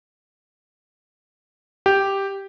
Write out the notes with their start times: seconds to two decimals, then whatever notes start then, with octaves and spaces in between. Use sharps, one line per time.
1.86 G4